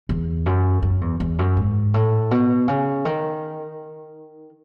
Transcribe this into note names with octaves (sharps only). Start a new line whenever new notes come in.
E2
F#2
F#2
E2
E2
F#2
G#2
A2
B2
C#3
D#3